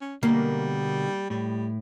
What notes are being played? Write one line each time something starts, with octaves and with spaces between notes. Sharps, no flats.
C#4
B2 D3 G3 A#3
A2 G3